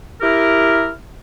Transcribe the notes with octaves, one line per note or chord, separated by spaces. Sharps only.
E4 G4 A#4